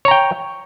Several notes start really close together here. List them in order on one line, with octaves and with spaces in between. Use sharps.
C#5 A#5 G5